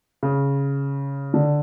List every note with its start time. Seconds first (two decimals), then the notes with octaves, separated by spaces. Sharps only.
0.23 C#3
1.34 D3